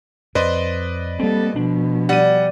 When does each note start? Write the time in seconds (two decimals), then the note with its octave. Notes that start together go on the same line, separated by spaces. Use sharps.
0.35 F2 B4 C5 D5 D#5
1.19 G3 A#3 C4 A4
1.56 B2 F3 D4
2.09 G3 F#5 D#7